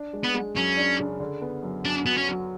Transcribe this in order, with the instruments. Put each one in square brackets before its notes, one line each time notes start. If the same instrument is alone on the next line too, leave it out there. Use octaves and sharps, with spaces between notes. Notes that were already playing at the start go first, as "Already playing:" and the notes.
Already playing: [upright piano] D4
G#3
[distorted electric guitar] B3
[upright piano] G#3
[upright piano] F#2 [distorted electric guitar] C#4
[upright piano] D4
C#3
D3
B3
F#2
[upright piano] F#2 [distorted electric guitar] D4
[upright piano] F#3 [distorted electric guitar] B3
[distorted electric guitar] C#4
[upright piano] F#3